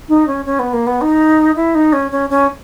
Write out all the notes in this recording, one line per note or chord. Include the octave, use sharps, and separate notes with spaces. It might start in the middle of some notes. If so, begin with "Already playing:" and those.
D#4
C#4
C#4
B3
A#3
B3
D#4
E4
D#4
C#4
C#4
C#4